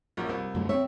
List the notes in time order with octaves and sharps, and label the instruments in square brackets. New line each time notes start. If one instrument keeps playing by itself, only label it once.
[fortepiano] A#1 F#2 A#4
[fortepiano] C2 [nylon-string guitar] A#4
[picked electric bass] F#2 F#3 A3 [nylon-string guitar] D3
[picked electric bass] A3 C4 [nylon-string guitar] C#5 [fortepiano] E5